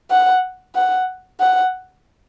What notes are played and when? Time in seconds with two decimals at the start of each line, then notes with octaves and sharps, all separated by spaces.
0.11 F#5
0.75 F#5
1.40 F#5